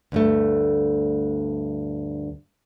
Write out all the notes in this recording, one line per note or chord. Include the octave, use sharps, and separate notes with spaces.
D2 G2 A3